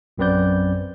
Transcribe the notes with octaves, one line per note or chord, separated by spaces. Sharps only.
A#1 F#2 C4 B4 D5 G6